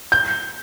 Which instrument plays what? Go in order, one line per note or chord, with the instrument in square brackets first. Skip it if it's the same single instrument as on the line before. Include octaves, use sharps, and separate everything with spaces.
[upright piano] G6